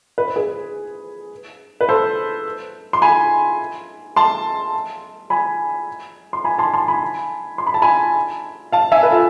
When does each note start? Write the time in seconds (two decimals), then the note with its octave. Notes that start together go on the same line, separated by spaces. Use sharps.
0.18 B4
0.27 C5
0.36 G#4 B4
1.81 B4
1.89 A4 C5
2.93 C6
3.02 G#5 B5
4.16 A5 C6
5.30 G#5 B5
6.33 C6
6.44 G#5 B5
6.58 A5 C6
6.73 A5 C6
6.88 G#5 B5
7.58 C6
7.67 B5
7.74 A5
7.82 G#5 B5
8.72 F5 A5
8.92 E5 G#5
9.03 B4
9.11 F4 A4